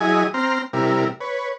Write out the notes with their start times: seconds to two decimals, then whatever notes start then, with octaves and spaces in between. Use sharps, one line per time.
0.01 F#3 E4 G#4 D#5 G#5
0.34 C4 A#5 C6 F6
0.73 C3 G3 E4 A#4
1.21 B4 C#5